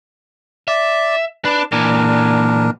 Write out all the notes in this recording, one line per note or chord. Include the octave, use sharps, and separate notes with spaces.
D5 E5
D4 B4
A#2 E3 D4 A#4